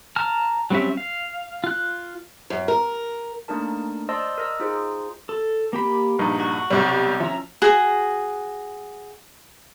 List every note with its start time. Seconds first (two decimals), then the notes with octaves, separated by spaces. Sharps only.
0.16 A5 A#5 F6
0.70 F#3 G3 C4 C#4 E5
0.97 F5
1.64 F4 F#6
2.50 F#2
2.68 A#4
3.48 A3 A#3 D4 D#4 A#4 A5
4.09 C5 D5 D#5 A5 C6 E6
4.38 A#4 D#5 E6
4.60 D#4 F4 G#4 C5
5.29 A4
5.73 A#3 G4 B5
6.19 A#1 G2 D#4
6.40 F#4
6.70 B1 C3 G3
7.20 F3 C#4 E5 A#5
7.62 F#4 G#4